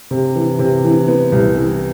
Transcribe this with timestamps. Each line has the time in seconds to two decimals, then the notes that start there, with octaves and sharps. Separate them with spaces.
0.11 C3
0.36 E3
0.59 C3
0.84 E3
1.08 B3
1.32 C2
1.57 E3